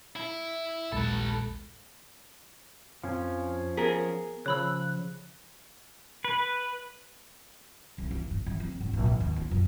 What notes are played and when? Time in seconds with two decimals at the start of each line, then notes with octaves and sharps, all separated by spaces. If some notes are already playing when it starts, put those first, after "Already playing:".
0.16 E4
0.92 A#1 D#2 G#3 A4 B4
3.04 F2 F3 C#4
3.77 B3 G#4 A#4 B6
4.46 C#3 F3 C#5 B5 E6 F#6
6.25 B4
7.98 C2
8.11 E3
8.31 G2
8.46 E3
8.60 C4
8.81 G#1
8.93 A#1
9.06 G#2
9.20 D#2
9.36 F4
9.51 F#2